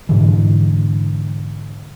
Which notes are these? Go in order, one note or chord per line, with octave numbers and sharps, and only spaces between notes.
G#2 B2 D3 E3